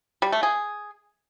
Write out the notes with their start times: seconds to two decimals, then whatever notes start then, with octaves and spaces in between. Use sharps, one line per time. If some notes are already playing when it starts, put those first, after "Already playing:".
0.22 G3
0.32 A3
0.43 G#4